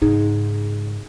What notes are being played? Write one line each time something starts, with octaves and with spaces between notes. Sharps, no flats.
G#2 C#3 D#4 G#4